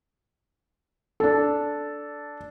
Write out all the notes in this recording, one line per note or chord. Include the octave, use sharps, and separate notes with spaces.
D4 A4